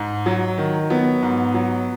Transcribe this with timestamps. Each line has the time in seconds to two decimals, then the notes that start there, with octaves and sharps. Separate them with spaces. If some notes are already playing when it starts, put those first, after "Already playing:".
Already playing: G#2
0.26 F#3
0.58 D#3
0.90 F#3 B3
1.22 G#2
1.54 F#3